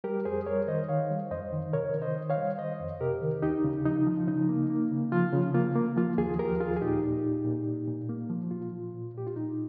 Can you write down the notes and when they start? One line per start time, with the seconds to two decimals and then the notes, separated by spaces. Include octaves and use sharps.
0.04 G3 G4 A#4
0.25 F2 G#4 C5
0.46 G3 A#4 C#5
0.67 D#3 C5 D#5
0.89 D#3 C#5 F5
1.10 G3
1.31 F2 C5 D#5
1.53 D#3
1.73 C3 A#4 C#5
1.94 D#3
2.02 C5 D#5
2.16 D#3
2.30 C#5 F5
2.37 G3
2.58 D#3 C5 D#5
2.80 F2
3.00 C3 G4 A#4
3.22 D#3
3.42 D#2 D#4 G4
3.64 C#3
3.85 F3 D#4
4.06 F3
4.28 C#3 D#4
4.49 A#3
4.70 A#3
4.92 C#3
5.12 F3 F4
5.33 C#3
5.54 A#3 F4
5.76 A#3
5.97 F3 F4
6.18 D#2 F4 G#4
6.39 F3 G4 A#4
6.60 D#2 F4 G#4
6.77 G#4
6.81 A#2 D#4 G4
7.03 A#2
7.24 A#2
7.45 A#2
7.67 A#2
7.88 A#2
8.09 A#3
8.29 F3
8.51 A#2 F4
8.73 A#2
8.94 A#2
9.15 A#2 G4
9.27 F4
9.36 A#2 D#4